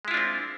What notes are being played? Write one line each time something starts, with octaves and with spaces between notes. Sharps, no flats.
G#3 C4 D4 E4 F4